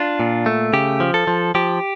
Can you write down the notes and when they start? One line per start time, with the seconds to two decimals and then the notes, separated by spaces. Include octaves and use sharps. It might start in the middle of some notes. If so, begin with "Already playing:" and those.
Already playing: D4 F4
0.20 A#2
0.46 A3
0.73 C#3 G4
1.00 F3
1.14 A4
1.27 F3
1.55 F3 G4